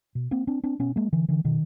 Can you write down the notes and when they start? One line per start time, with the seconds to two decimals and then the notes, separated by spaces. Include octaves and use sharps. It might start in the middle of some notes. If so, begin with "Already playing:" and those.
0.15 B2
0.31 A#3 C4
0.47 C4 D4
0.64 C4 D4
0.79 B2 B3 C#4
0.96 G#3 A#3
1.13 D3 E3
1.28 D3 E3
1.45 B2 D#3